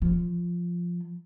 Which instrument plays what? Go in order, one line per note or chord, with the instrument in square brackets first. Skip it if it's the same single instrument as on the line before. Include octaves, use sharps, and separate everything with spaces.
[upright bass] F3